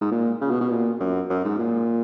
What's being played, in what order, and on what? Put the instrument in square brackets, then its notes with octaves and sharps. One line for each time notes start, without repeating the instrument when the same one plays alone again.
[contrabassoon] G#2
A#2
C#3
B2
B2
A#2
F#2
F#2
G#2
A#2